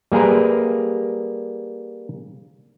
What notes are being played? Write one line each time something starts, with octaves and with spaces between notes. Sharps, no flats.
G3 A#3 G#4 A#4 B4